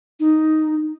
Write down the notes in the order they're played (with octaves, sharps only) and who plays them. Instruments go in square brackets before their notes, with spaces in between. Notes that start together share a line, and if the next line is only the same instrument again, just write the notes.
[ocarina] D#4